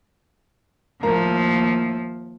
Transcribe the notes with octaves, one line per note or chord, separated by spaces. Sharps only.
D#2 A2 F3 A#3 A#5